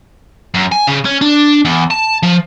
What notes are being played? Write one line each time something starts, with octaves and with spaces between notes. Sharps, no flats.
F#2
G#5
C#3
C#4
D4
E2
A5
F3